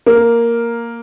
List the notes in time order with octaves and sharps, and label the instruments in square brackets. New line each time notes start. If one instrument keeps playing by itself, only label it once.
[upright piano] A#3